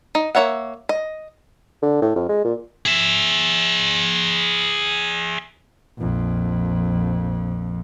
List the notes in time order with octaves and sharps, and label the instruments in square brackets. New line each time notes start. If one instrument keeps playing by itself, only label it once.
[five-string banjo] D#4
A#3 D#4 C#5 E5 F#5
D#5
[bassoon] D3
A2
F2
G#3
A#2
[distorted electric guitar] G#4 E5
[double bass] A#1 F2